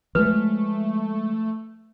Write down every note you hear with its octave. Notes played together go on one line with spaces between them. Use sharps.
F3 G#3 A3 B4